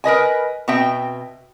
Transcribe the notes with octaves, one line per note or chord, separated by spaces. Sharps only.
A#4 B4 D#5 G#5
B2 C4 E5 G5